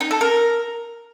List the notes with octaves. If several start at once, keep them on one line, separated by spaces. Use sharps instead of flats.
D#4
A4
A#4